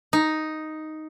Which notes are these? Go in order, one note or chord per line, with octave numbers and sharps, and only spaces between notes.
D#4